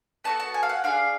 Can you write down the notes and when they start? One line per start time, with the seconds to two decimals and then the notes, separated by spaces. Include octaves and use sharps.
0.24 B3 F#4 A4 A5
0.40 A5
0.54 G#5
0.63 F5
0.69 F#5
0.84 D4 F4 G#4 F5